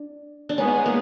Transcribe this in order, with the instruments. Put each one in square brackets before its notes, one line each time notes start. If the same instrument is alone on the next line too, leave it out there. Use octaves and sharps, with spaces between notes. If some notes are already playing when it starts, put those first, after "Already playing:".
Already playing: [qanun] D4
D4
[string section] G#3 B3 D#4 G#4 [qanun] C#4
[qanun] A#3